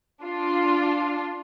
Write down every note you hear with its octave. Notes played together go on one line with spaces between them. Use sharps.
D4 F4